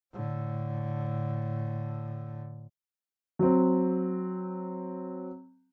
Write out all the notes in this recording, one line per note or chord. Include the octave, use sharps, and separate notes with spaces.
A2 D3
F#3 C4